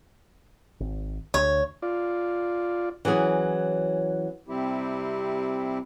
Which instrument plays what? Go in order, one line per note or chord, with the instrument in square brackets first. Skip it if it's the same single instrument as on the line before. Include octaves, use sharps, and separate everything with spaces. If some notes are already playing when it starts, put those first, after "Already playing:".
[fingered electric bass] G#1
[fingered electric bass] D2 [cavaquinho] C#5
[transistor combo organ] F4 D5
[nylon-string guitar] E3 F#3 C#4 G#4
[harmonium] C3 G3 C4 E4 G4